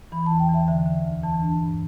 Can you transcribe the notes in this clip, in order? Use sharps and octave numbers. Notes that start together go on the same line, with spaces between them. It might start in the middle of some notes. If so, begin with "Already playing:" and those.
E3 B5
E2 A5
G5
E3
E5
D3 E5
D3
D2
E3 A5
D4
G2